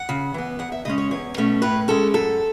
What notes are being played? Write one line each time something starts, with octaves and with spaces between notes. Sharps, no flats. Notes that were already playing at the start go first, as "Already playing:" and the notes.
Already playing: F#5
C#3
E3 B3
E2 F#5
E5
C#3 G#3 C#4 D#5
C#5
E2 C#5
B2 A3 C#4
A2 B4
G#3 C#4 A4
F#2 A4